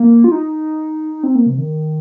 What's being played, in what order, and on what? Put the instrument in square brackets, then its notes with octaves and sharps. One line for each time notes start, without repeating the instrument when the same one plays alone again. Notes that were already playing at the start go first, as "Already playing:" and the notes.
Already playing: [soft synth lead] A#3
F4
D#4
C4
A#3
C3
D#3